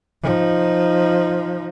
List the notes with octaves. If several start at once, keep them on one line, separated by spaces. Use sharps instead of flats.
F3 D#4